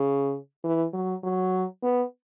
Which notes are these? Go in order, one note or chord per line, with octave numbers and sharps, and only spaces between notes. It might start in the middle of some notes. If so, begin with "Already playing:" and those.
Already playing: C#3
E3
F#3
F#3
B3